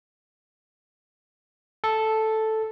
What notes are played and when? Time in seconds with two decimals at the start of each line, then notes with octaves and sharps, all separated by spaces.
1.84 A4